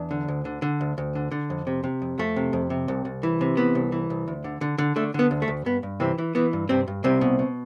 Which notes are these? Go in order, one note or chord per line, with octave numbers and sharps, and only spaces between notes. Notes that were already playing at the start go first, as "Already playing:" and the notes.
Already playing: E2 D4
D3
D2
D3
D3
D2
D2
D3
D3
F2
C3
C3
F2
F2 A3
C3
F2
C3
C2
C2
E3
C3
E3 B3
C2
E3
C2
D2
D3
D3
D3
D3 A3
D3 B3
D2
A3
D2
G2 B3
G2
C3 E3 C4
E3
E3 B3
G2
G2 C3 C4
G2
C2 C3 C4
B2
B2